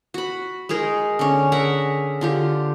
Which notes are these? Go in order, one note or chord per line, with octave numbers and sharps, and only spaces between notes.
F#4 B5
G#3 D#4 G#4 A#4
D3 C#4
G#4 A#4 E5 F#5
D3 F4 G4